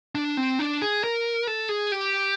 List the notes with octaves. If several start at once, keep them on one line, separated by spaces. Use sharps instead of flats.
D4
C4
D4
G#4
A#4
A4
G#4
G4